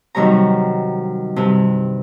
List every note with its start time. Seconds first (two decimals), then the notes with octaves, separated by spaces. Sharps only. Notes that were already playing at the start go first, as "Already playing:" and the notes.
0.15 F#2 C3 D#3 G3 C#5 A#5
1.36 G2 C3